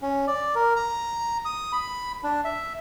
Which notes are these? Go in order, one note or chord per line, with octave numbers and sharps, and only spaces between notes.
C#4
D5
A#4
A#5
D#6
B5
D4
E5